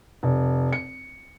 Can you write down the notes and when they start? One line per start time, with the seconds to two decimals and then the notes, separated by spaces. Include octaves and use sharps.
0.23 F1
0.73 C#7